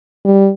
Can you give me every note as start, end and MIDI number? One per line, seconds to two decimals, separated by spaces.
0.25 0.49 55